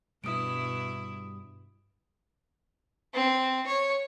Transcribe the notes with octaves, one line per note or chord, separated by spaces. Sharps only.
G2 B2 G3 E4 D#6 D7
C4
C#5